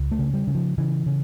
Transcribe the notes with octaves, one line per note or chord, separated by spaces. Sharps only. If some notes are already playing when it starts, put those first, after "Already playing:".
Already playing: C#2
A3
C#3
G3
C#3
F3
C#3 E3
C#3